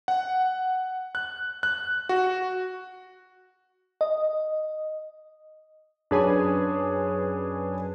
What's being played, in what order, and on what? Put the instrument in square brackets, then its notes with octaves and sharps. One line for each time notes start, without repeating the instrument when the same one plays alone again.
[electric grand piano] F#5
F#6
F#6
F#4
[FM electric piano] D#5
[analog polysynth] F#2 B4 G#5 [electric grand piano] D4 G#4 C#5